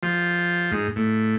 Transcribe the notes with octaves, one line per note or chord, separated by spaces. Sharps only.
F3
G#2
A2